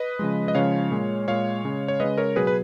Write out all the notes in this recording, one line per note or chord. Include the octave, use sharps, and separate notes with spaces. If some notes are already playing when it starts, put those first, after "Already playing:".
Already playing: B4 D#5
C#3 F3 G#3
D#5
C#3 F3 G#3 C#5 F5
A#2 G#3
A#2 G#3 C#5 F5
C#3 G#3
C#5
C#3 G#3 B4 D#5
A#4 C#5
B2 F#3 G#4 B4
B4